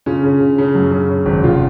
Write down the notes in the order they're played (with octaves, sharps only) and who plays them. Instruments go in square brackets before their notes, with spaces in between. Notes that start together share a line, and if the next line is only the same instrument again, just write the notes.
[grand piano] C#3 C#4 F4
C#3
C#3
C#3
F#2
C#3
C#3
G#1
F1 C#4 F4